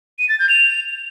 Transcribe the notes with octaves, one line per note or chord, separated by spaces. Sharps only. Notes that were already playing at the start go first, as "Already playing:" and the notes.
D#7
A6
G6
F7